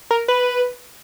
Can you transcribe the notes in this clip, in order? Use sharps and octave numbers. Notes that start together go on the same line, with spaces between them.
A#4
B4